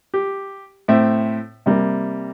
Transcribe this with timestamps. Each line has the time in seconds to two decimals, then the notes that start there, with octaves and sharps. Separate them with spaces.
0.14 G4
0.88 A2 C4 E5
1.66 C3 G3 A#3